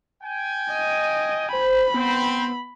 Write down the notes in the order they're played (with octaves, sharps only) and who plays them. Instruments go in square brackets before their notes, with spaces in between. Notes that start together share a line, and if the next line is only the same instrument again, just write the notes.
[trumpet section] G5 G#5
[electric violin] D#5
[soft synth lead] C5 [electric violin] B5
[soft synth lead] B3 [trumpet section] C4